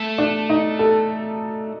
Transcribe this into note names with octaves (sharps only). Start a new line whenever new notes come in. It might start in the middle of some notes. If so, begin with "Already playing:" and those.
Already playing: A3
D4
D#4
A4